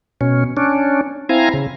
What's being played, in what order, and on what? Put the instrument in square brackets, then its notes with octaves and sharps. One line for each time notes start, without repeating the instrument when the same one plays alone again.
[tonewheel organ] B2 C#4
C#4 D4
C4 E4 F5 G#5 A#5
C#3